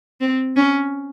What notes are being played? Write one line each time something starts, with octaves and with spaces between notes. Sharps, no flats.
C4
C#4